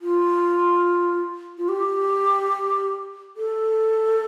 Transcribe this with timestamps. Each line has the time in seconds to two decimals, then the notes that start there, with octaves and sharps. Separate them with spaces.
0.01 F4
1.58 F4
1.69 G4
3.37 A4